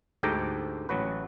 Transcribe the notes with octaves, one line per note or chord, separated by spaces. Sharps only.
D2 G#2 G4 A4 G5 A#5
A1 F#3 F#4 B4